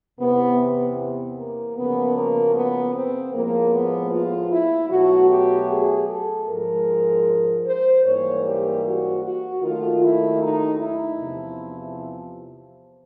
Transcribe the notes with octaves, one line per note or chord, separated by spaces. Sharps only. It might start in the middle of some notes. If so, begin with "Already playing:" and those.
E2 C3 E3 B3
A#3
F#2 C#3 F3 A#3 B3
A#3
B3
C4
A2 F3 G#3 A#3
B3
F4
E4
B2 F#3 A3 F#4
G4
G#4
A4
G#2 F3 G#3 A#4
C5
G#2 E3 G3 A#3 C#5
G4
F#4
F#4
D#2 D#3 F#3 A3 F4
E4
D#4
E4
E2 C3 F3